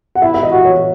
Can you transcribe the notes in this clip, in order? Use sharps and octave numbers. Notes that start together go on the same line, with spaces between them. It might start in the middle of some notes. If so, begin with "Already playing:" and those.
F#5
E4 E5
E5
D#5
F#4
C#5